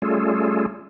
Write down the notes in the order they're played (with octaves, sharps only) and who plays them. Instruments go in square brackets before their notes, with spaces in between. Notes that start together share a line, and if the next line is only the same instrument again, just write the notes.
[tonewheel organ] G3 A3 C#4 F4 G#4 A4